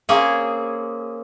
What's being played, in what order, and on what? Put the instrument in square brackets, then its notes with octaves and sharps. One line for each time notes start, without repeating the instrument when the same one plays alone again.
[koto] A#3 C4 C#4 G#4